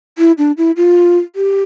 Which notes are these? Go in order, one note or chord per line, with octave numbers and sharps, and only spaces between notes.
E4
D4
E4
F4
G4